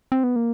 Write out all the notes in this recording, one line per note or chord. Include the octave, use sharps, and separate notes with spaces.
C4
B3
A#3